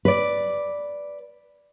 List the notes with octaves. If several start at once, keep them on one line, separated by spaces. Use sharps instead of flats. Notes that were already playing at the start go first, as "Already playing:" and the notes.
B4 D5